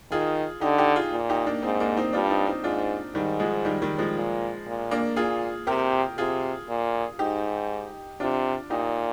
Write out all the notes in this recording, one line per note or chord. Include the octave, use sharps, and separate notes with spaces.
D#3 F4 G#4
D3 D#4 G4
D#4 G4
F4 G#4
A#2
D#4 G4
A#3 D4
G#2 C4 D#4
A#3 D4
C4 D#4
G2 D4 F4
C4 D#4
C4 D#4
G#2 D4 F4
G#2 D#3 G3
F3 G#3
D#3 G3
D#3 G3
F3 G#3
A#2
A#2
A#3 D4
A#2 F4 G#4
C3 G4 A#4
C3 F4 G#4
A#2
G#2 D#4 G4
C3 D4 F4
A#2 D#4 G4